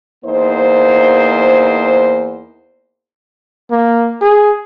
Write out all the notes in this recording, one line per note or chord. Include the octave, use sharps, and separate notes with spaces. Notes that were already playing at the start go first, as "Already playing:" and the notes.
E2 A#3 D#4 C5
A#3
G#4